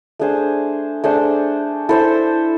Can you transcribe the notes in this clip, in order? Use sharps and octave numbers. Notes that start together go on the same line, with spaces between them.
A3 D4 G#4 C5
A3 D4 G#4 C5
E4 A4 C5 E5